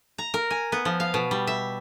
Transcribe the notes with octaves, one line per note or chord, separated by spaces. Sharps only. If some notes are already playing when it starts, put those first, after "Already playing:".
A#5
A#4
G#5
B3
F3
F5
B2
G3
E5